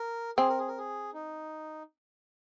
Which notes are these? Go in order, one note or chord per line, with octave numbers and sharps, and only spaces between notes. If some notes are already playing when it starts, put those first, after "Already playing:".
Already playing: A#4
C4 G#4
A#4
G#4
A#4
G#4
D#4